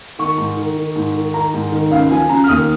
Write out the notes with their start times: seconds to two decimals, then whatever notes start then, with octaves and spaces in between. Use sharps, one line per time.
0.19 D#3 C#6
0.38 G#2
0.57 D#3
0.77 D#3
0.96 G#2
1.15 D#3
1.34 D#3 A#5
1.54 G#2
1.72 D#3
1.91 C#2 F5
2.10 F3 G#5
2.29 C#3 A#5
2.44 F6
2.49 D#2 D#6